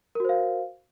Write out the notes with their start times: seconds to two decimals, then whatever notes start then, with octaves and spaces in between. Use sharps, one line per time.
0.15 A#4
0.20 F#4
0.25 C5
0.29 F5